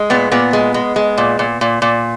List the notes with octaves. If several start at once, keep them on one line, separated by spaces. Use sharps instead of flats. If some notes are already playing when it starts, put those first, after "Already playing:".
Already playing: G#3
A#2 B3
A#2 B3
G#3
G#3
G#3
A#2
A#2
A#2
A#2